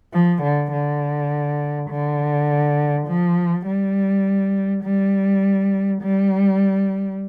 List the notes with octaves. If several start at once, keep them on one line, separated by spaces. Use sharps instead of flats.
F3
D3
D3
D3
F3
G3
G3
G3